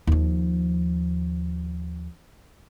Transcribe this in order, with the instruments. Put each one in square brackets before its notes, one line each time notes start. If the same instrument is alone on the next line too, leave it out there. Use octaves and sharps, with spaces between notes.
[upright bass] D#2 F3